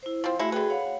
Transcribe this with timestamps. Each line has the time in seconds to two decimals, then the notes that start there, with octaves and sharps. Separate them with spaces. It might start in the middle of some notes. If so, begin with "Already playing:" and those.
0.03 E4 C5
0.24 F3 C4
0.39 G#3 A3 E4 F#4
0.52 D3 F#4 G#4 B4 G5
0.70 C#5 F5 F#5